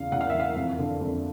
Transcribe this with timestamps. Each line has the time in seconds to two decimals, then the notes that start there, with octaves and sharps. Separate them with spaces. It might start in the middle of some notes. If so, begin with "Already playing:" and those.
Already playing: E2 C#3 F5
0.12 E2 F#5
0.21 F5
0.30 E5
0.34 E3
0.40 F5
0.56 F2
0.78 D3
1.01 F2